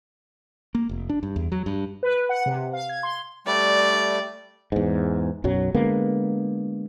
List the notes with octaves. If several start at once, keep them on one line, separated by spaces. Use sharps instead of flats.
A#3
F1
D4
G2
E2
F#3
G2
B4
F#5
C3
F5
G#6
C6
G3 A3 D5
E2 G#2
B1 F#2 F#3
D3 G#3 A#3 B3